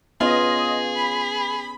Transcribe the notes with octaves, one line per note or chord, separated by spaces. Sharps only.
B3 C#4 F4 G#4 D#5
B5